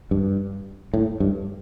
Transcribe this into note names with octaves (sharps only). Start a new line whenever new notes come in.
G2
A2
G2